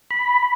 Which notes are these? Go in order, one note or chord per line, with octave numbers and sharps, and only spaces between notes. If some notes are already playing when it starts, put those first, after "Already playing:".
B5